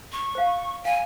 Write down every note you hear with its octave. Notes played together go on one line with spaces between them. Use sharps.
C#6
C5 F5
F5 G#5